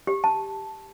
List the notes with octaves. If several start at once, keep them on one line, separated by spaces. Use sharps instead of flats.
G4
A5